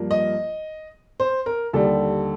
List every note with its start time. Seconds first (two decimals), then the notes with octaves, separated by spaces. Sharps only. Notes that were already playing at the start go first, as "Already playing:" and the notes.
Already playing: G2 F3 A#3
0.11 D#5
1.20 C5
1.46 A#4
1.73 D#2 D3 G3 A4